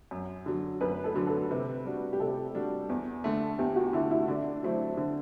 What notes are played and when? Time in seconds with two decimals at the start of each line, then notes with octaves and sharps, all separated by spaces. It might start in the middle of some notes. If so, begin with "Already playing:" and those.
0.11 F#2
0.46 D3 F#3
0.81 F#2 B4
1.04 A4
1.15 D3 F#3
1.27 A4
1.51 C3 B4
1.85 G3 D4 F#4
2.13 G4
2.20 C3 A4
2.55 G3 D4 F#4
2.89 E2
3.24 D3 A3
3.59 E2 G4
3.76 F#4
3.93 D3 A3 E4
4.11 E4
4.28 D3 D4
4.63 F#3 A3 C4 E4
4.97 D3